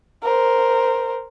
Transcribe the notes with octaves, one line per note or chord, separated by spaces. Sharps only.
A#4 C5